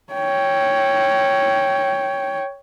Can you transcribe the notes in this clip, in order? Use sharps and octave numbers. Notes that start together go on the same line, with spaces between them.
C#5 G5